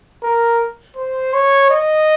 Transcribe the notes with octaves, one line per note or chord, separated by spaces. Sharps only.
A#4
C5
C#5
D#5